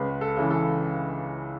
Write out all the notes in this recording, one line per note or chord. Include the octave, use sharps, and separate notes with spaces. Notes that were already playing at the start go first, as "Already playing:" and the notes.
Already playing: C#2 B4
A4
C#3 E3
A4